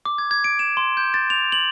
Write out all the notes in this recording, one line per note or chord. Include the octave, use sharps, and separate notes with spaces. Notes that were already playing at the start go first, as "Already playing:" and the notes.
D6
G#6
G#6
D7
E7
C6
G6
A6
F7
F#7